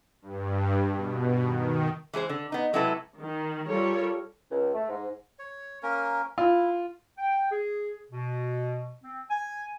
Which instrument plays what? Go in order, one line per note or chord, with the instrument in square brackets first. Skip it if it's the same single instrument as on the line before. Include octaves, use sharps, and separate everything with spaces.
[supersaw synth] G2
B2
D#3
[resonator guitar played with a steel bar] E3 G#3 G#4 C5
D3
B3 D#4
C3 F#3 G#3 E4 A4 B4
[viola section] D#3
G3 F4 A4 A#4 C#5
[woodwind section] C#2
A3
G#2
[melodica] C#5
A#3 C#4 A#4
[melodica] E4 [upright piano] F4
[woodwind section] G5
G#4
B2
C4
G#5